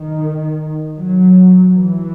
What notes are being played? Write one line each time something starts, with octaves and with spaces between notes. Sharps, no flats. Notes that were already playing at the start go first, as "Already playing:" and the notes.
Already playing: D#3
F#3
E3